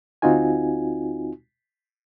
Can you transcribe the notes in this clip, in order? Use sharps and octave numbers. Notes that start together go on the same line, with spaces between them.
D2 C4 D#4 F4 F#4 G#5